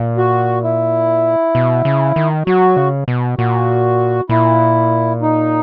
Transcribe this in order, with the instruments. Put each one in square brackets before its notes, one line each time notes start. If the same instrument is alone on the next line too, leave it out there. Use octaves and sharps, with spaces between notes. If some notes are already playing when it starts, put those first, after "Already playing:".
Already playing: [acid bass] A#2
[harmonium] F#4
E4
[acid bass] B2
C#3
D#3
[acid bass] F#3 [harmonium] F#4
[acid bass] C#3
B2
[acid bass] A#2 [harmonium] F#4
[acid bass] A#2 [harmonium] E4
[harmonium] D#4